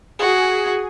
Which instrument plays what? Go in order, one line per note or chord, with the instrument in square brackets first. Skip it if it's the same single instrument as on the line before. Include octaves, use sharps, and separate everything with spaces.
[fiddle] F#4 [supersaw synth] G#4